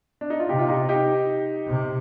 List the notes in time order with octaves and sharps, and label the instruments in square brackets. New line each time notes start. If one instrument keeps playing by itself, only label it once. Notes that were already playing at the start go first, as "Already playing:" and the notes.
[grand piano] D4
D#4
F4
[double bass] C3 [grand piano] D#4 G4
[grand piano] F4
D#4 G4
D#4 G4
[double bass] C3